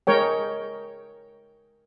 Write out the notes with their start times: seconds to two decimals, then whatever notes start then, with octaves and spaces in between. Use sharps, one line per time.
0.07 G#3 A#4 C#5 G5